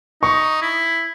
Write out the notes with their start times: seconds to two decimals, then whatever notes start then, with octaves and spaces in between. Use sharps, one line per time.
0.22 D#4 C#6
0.62 E4